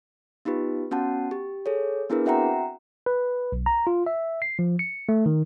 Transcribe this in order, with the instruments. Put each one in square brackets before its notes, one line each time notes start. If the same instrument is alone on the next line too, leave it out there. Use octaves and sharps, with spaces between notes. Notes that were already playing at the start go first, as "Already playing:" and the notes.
[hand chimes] B3 D#4 F4 G4 B4
B3 C#4 F#4 F#5 A5
G4
G#4 A4 C#5
B3 D4 E4 G#4 A#4 B4
C4 F#4 E5 F#5 G5 A#5
[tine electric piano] B4
B1
A#5
F4
E5
C7
F3
C#7
A3
D#3